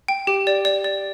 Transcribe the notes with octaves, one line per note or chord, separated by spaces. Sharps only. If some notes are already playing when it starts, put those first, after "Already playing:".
G5
G4
D5
D5
D5